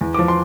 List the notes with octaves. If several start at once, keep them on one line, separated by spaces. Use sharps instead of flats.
E2
F3 D6
C6